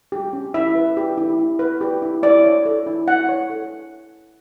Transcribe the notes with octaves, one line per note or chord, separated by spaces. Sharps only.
G4
C#4
E4 E5
B4
G4
E4
E4
B4
G4
E4
E4 D5
C#5
A4
E4
E4 F#5
C#5
A4